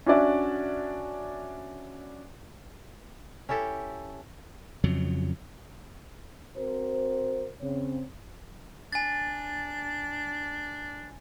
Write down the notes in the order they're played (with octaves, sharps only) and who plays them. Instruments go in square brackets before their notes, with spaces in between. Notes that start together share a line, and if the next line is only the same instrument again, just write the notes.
[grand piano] C#4 D4 F#4 D5 E5
[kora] C#4 E4 G4 A4
[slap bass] F2 C#3 F#3
[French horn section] C4 F#4 A#4 C5
C#3 C4 C#5
[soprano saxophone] D4 [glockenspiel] G#5 A6